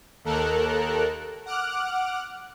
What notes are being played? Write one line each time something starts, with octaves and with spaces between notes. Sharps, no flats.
D#2 A4 A#4 F#6
F#5 D6 F6 F#6